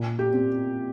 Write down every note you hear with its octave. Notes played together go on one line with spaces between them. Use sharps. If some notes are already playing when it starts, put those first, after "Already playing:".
Already playing: A#2
G4
C4